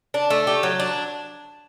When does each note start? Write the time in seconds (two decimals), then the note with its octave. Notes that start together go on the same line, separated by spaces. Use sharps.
0.14 D4
0.30 A3
0.47 G4
0.63 F#3
0.80 D4